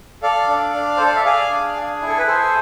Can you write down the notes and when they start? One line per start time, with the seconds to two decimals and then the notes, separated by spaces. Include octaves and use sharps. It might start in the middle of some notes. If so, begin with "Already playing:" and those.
0.22 A4 D5 F5
0.48 D4
0.74 D4
0.97 A4 C5
1.07 D5
1.16 E5
1.25 G#4 D5 F5
1.51 D4
1.76 G#4
2.02 E4
2.08 A4
2.18 B4
2.27 G#4 A4 C5